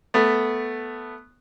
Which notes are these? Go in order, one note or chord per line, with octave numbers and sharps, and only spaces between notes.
A3 B3